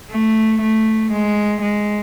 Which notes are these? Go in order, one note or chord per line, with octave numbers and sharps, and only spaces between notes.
A3
A3
G#3
G#3